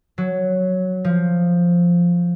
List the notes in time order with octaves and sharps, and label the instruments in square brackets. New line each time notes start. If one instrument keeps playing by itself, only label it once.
[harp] F#3
F3